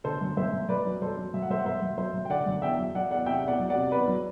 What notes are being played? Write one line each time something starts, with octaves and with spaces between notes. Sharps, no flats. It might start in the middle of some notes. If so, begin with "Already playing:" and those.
D3 A4 C5
F#2
F#2 C5 E5
F#2
F#2 B4 D5
F#3
F#2 A4 C5
F#3
F#2 E5
F#5
F#2 C5 E5
F#5
F#2 C5 E5
F#2
F#3 C5 E5
F#2
G5
D3 D5 F#5
F#2
E2 E5 G5
F#3
F#3 D5 F#5
E2 D5 F#5
C3 E5 G5
E2 D5 F#5
F#3
D5 F#5
C3
E2 B4 D5
F#3